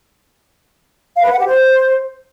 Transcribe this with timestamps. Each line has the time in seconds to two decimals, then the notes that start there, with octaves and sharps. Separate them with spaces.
1.15 F5
1.23 B4
1.31 F#5
1.38 G4
1.46 C5